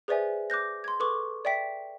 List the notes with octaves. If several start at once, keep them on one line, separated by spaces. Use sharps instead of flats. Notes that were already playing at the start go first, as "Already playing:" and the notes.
G#4 B4 C5 D5 E5 G#5
D6 F#6 G6 A#6
C6 G#6
A4 B4 C#6 D6
D5 E5 G5 B6